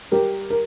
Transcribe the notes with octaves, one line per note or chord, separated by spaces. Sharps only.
G3 G4 A#4
A#4